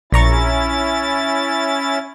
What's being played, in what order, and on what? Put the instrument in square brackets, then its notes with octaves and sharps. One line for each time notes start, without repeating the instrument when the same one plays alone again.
[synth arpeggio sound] A#1 A#5 C#6 [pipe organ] C#4 E4 A6